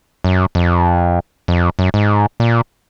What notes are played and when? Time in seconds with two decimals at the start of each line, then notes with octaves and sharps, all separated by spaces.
0.24 F#2
0.55 F2
1.48 F2
1.79 F#2
1.94 G#2
2.40 A#2